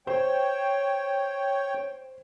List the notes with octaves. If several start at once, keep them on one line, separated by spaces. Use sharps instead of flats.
C5 C#5 G5